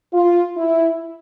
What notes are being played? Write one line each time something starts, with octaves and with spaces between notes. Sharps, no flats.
F4
E4